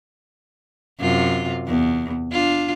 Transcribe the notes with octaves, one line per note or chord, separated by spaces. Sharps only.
F#2 C3 F4
E2
D4 F4